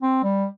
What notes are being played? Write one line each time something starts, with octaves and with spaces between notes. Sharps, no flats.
C4
G3